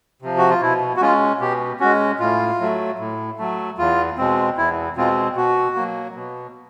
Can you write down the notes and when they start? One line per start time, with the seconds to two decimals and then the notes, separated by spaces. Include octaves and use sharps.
0.22 C3 F3
0.38 F#4
0.50 F4
0.61 B2 E4
0.97 F#4
1.01 G#3 C#4 F4
1.41 B2 G4
1.80 G#3 C#4 F#4
2.20 A2 F4
2.60 F#3 A3
2.99 A2
3.38 F#3 A3
3.78 E2 F4
4.18 B2 G#3 C4
4.57 E2 E4
4.97 B2 G#3 C4 F4
5.36 B2 F#4
5.76 F#3 A#3
6.15 B2